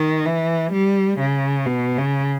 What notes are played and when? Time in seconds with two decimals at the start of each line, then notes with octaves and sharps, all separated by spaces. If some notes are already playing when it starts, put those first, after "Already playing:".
Already playing: D#3
0.26 E3
0.73 G3
1.19 C#3
1.66 B2
1.98 C#3